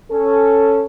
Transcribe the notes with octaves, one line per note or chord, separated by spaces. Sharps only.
C#4 A4